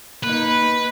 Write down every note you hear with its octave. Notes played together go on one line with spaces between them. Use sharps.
A#3 D#4 B4